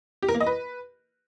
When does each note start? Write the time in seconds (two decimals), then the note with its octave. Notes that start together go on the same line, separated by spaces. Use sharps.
0.22 G4
0.28 A#4
0.35 A#3
0.41 D#5
0.47 B4